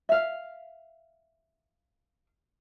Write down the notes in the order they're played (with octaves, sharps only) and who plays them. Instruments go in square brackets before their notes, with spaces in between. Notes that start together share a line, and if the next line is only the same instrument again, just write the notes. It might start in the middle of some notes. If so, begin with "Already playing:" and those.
[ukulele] E5 F5